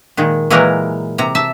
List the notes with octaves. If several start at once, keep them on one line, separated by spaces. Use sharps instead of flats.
A#2 D#3 G#3
A#2 E3 F#3 G#3 G4 A#4
C3 A#5
E5 A5